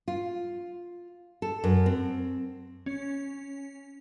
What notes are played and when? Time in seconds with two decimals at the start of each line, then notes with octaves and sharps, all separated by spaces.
0.08 F4
1.42 A4
1.64 F#2
1.86 C4
2.86 C#4